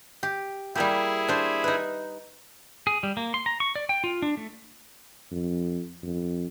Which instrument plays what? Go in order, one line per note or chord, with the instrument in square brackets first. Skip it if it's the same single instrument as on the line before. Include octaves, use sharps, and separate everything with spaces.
[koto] G4
[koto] G3 A#3 G4 [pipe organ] E4 G#4
[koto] D4 C5
D#4 B4
[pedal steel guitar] G#4
G3
A#3
C6
A#5
C#6
D5
G5
F4
D4
A3
[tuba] F2
F2